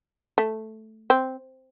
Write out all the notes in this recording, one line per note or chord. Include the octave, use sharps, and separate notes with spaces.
A3
C4